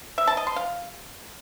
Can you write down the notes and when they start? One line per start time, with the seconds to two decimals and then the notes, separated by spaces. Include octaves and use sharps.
0.18 E5
0.27 A5
0.37 D#5
0.47 C6
0.56 F5